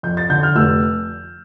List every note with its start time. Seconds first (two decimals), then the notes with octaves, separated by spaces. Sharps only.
0.03 F2 G6
0.17 A6
0.30 D3 G6
0.43 F6
0.56 F1 E6